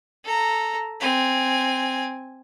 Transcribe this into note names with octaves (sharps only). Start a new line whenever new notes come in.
A4 A#5
C4 G#5